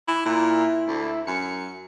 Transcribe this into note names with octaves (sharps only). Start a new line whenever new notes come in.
E4
A#2 E4
D2
F#2 C#7